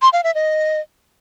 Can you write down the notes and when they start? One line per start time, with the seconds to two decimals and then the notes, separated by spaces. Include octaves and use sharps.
0.02 C6
0.13 F5
0.24 E5
0.35 D#5